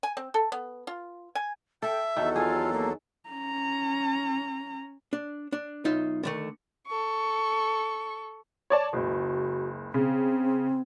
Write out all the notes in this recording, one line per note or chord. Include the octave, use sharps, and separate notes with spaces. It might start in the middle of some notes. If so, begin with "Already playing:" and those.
G#5
C4
A4
B3
F4
G#5
A4 E5 G5
E2 D#3 F#3 A4
F4 G#4
A#3
C#4 A#5
D4
D4
B1 D#4 F4 E5
D3 D#3 A3
A4 C#6
C#5 D5 A5
F#1 C#2 F#4
C#3 C4